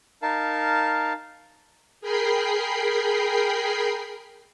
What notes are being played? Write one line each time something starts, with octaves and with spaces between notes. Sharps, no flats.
D#4 A#4 F5 A5
G#4 A#4 G5 B5 C7